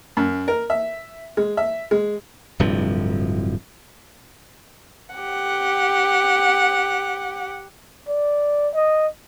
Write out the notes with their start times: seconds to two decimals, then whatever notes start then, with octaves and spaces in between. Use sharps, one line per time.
0.17 F#2
0.48 A#4
0.70 E5
1.37 G#3
1.57 E5
1.91 G#3
2.59 D1 G2 C3 F3
5.15 G4 F#5
8.08 D5
8.75 D#5